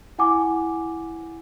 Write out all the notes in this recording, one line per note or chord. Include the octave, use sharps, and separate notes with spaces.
E4 F#5 G#5 D6